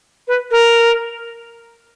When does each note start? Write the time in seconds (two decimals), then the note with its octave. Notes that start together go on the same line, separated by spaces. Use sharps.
0.28 B4
0.51 A#4